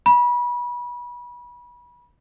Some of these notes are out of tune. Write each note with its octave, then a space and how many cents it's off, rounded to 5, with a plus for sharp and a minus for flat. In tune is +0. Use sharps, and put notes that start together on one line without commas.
B5 -30